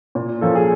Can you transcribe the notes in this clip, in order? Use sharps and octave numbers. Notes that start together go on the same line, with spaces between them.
A#2
F3 A#3 C#4 A4
G#4